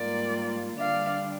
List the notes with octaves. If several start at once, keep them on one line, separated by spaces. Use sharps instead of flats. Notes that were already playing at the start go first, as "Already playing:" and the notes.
Already playing: G#2 G3 A#3 F4 A#4 D5
D3 G3 D4 D5 F5